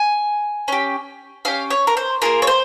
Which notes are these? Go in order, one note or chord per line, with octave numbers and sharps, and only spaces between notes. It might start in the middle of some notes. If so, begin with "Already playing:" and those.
Already playing: G#5
C#4 G4
C#4 G4 F5
C#5
A#4
C5
A#3 F4 G#4 A#4
C#5
C5